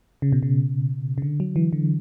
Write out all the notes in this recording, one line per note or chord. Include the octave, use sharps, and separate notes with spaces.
C#3
B2
C#3
C#3
D3
F#3
E3
D3